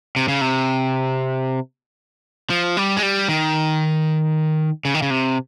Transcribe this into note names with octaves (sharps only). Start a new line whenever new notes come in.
C3
C#3
C3
F3
G3
G#3
G3
D#3
C#3
D#3
C#3
C3